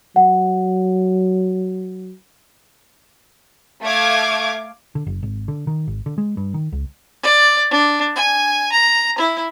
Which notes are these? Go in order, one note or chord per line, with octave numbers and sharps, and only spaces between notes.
F#3 F#5
A3 F5 D6 G#6
D3
F#1
G#1
D3
D#3
G#1
D3
G#3
G2
D#3
C#2
D5
D4
G#5
A#5
E4